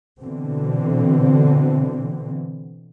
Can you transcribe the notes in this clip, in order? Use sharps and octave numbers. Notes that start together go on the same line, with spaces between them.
B2 D3 E3 C4